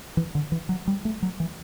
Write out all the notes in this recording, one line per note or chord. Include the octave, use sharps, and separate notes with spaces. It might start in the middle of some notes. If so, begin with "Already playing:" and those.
E3
D3
E3
F#3
G3
A3
F#3
E3